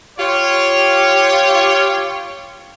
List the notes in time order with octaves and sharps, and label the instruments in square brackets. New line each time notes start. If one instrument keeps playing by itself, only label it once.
[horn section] F4 G4 C#5